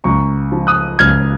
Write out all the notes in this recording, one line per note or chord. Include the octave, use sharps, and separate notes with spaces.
C#2 A#5 C#6
F3
D#6 F#6
C#2 F6 G#6